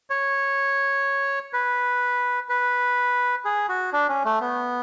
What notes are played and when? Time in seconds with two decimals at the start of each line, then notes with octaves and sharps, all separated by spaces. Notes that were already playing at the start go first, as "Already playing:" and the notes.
0.10 C#5
1.53 B4
2.49 B4
3.45 G#4
3.69 F#4
3.93 D4
4.08 C#4
4.25 A3
4.41 B3